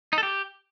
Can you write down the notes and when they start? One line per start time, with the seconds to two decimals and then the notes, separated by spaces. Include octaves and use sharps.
0.13 D#4
0.18 A4
0.23 G4